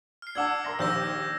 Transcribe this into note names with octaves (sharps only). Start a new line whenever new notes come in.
F6 C7
D4 F#5 A5 D6 E6 G#6
A#4 C6 A#6
A#1 D#2 C5 E6 G6 A#6